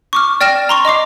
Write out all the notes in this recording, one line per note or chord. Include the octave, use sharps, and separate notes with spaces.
C#6 D6 F6
D5 G5 F6 A#6 E7
A#5 C6 C#6
D#5 A#5 D6 C7